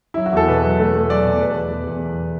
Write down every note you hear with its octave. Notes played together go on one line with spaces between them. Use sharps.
F#3 E4
F#4
E2 A4
B2 B4
F#3
A3
A3
F#3 D5
B2
E2 B4
E2
E2
E2
E3